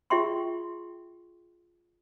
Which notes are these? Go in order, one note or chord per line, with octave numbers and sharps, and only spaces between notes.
F4 G#4 E5 G5 C6 C#6